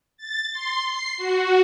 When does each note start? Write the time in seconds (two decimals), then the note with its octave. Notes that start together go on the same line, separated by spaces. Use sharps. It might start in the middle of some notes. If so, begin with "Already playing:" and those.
0.17 A6
0.53 C6
0.86 C7
1.17 F#4